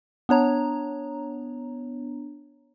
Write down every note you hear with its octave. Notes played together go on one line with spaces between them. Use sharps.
B3 D4 C#5 A#5